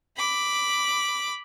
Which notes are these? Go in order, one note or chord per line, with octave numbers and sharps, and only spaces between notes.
B5 D6